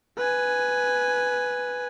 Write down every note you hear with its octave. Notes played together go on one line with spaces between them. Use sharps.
B4 G#5